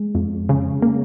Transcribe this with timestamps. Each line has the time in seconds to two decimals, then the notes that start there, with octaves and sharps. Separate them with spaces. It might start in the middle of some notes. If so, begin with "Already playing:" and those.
Already playing: G#3
0.15 F2
0.49 C#3
0.82 A#3